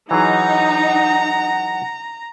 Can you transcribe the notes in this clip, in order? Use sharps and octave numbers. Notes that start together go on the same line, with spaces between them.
E3 F#3 D#4 G#4 F#5 A#5